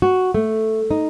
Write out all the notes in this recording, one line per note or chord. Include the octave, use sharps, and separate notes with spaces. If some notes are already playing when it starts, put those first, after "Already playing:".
F#4
A3
D#4